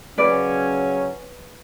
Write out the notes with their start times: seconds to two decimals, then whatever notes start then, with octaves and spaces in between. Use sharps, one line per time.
0.18 C#3 F#3 C#4 B4 D5